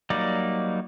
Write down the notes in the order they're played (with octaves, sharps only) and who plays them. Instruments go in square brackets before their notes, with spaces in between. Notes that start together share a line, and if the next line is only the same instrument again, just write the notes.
[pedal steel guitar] F#3 G3 A#3 D#4 D5